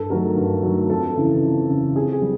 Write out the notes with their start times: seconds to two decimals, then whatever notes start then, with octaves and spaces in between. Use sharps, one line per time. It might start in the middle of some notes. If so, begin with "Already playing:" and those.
Already playing: G2 A4
0.10 D#3 F#3 A3 A#4
0.36 G2
0.63 D#3 F#3 A3
0.89 F2 A4
1.16 C#3 E3
1.42 F2
1.69 C#3 E3
1.96 F2 G#4
2.13 G#4
2.22 G3